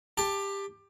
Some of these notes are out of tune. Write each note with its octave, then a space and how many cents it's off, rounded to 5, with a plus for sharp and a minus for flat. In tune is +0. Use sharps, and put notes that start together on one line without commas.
G4 +15 A5 +0